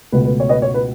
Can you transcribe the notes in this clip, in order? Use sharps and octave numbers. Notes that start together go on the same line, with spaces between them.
C#2 B2 A3 B4
B4
C#5
B4 D#5
C#5
B4